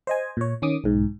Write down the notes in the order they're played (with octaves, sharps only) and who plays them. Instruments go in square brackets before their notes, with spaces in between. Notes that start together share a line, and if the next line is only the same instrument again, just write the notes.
[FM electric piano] C5 D#5 G#5
A#2 C#5
D#3 C#4 D6 D#6
B1 G#2